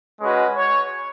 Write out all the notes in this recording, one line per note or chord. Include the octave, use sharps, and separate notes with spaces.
G#3 C#4 F#4 B4
C#5